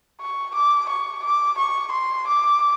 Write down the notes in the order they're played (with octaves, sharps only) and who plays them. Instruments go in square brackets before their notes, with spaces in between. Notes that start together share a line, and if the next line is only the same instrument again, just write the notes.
[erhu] C#6
D6
C#6
D6
C#6
C6
D6